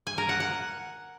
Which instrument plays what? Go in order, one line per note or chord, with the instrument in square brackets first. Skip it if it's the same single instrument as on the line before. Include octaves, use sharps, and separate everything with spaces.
[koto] G#5
A#4
F#5
F#5